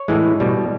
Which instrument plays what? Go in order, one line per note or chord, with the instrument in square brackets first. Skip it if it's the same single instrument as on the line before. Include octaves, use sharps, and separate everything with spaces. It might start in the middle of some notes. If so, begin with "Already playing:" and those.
Already playing: [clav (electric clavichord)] C#5
A2 E3 G#3
B2 G3